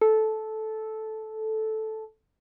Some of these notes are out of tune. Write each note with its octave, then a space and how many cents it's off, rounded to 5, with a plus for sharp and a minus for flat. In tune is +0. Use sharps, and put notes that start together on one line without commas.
A4 -10